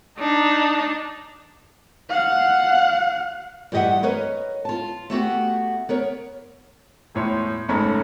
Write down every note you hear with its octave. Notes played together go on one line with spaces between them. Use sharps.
D4 D#4
F5 F#5
G2 E3 G4 D#5 E5 F#5
A#4 B4 C#5 D#5
F4 A5
A3 B3 F#4 G4
B3 A#4 C#5
E1 A2 C#5 C6
F#1 G#2 A3 C#4 B5